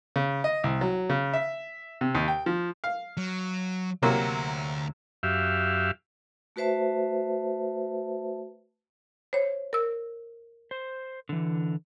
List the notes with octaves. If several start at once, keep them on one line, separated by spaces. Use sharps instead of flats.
C#3
D#5
C2
F#3
C#3
E5
C3
D#2
G5
F3
F5
F#3
D2 C3 F#3 A#3 F#5
F#2 G4 E5 F5
A3 F#4 B4 C5 E5 A5
C5 C#5
A#4 E6
C5
D3 E3